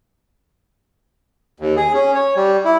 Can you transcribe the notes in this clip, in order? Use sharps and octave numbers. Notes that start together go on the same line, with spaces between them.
D#2
G#4
C#4
C#5
G3
E4